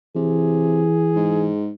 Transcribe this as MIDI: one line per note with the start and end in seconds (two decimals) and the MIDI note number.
0.16 0.87 48
0.16 1.50 52
0.16 1.72 68
1.16 1.71 44